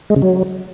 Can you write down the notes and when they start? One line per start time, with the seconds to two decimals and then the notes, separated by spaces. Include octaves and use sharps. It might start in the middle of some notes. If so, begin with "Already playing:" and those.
0.10 G#3
0.16 C#3
0.22 F#3